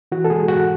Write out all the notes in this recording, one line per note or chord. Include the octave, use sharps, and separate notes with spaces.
E3 F#4
A4
G#3 G#4
G#2 F#4